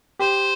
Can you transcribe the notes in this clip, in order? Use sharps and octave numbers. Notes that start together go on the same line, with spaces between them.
G4 C5